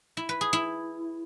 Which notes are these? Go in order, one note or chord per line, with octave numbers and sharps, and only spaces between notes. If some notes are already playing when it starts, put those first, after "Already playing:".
E4
B4
G#4
E4